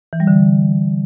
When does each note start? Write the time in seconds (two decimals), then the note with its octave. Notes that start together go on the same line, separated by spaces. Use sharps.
0.13 E3
0.20 G3
0.27 D3